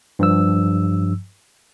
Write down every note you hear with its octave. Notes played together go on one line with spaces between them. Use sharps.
G2 F3 E6